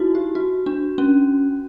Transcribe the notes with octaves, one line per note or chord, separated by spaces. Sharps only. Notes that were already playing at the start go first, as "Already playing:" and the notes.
Already playing: D#4 E4 F#4
G4
F#4
D4
C#4